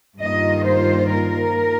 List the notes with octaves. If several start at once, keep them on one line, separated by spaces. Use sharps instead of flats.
G2 D#3 A#3 F4 D#5
C5
A#4